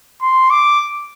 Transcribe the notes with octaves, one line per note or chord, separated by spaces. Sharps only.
C6
D6